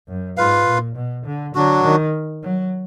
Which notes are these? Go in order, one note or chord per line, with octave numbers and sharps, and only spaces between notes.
F#2
G#2 F4 B4 F5
A#2
B2
D3
D3 F#3 D4 F#4
D#3
F#3